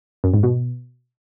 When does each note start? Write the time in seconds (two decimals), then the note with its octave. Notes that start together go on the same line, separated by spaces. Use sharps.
0.24 F#2
0.34 G#2
0.43 B2